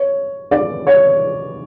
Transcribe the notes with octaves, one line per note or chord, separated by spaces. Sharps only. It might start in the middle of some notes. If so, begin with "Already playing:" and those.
Already playing: C#5
D5
C#5